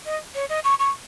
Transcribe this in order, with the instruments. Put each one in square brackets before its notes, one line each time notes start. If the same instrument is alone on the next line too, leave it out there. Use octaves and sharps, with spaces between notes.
[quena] D#5
C#5
D#5
C#6
C#6